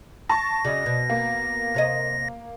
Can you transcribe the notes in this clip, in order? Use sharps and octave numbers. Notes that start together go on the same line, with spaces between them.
A5 C#6 A6 A#6
C#3 F#3 D5 D#5
B2
A#3
C3 C#5 D#5